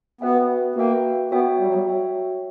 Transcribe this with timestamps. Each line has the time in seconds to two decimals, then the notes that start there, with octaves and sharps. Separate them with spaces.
0.21 B3 F#4 B4 E5 G5
0.76 A#3 F#4 B4 E5 G5
1.31 B3 F#4 C#5 E5 G5
1.59 G3
1.67 F#3
1.74 G3
1.87 F#4 C#5 E5 G5